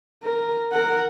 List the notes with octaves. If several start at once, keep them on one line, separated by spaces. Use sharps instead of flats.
A#4
A#4 F#5